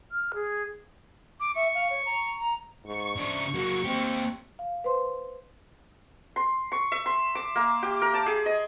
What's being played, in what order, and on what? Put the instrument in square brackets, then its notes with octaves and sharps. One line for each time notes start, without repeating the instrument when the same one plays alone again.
[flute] F6
G#4
[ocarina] D6
[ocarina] E5 [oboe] C#6
[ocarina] F5
C#5
A#5
A#5
[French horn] G#2 [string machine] C#6
[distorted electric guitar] C#3 C5 [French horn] D4
[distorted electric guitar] F#3 A#3 [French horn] F#4
[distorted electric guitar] A#3 G4 [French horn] C4
[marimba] F5
B4 C5 C6
[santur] C6
C#6
E5
C6
D6
A#3
G4
A#4
A5
G#4
D#5